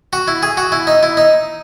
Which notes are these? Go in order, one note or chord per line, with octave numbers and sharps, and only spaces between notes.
F#4
E4
G#4
F#4
E4
D#4
E4
D#4